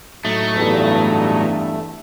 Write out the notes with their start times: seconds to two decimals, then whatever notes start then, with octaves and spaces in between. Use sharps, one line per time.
0.25 A2 F#3 A3 D#4
0.56 E2 G2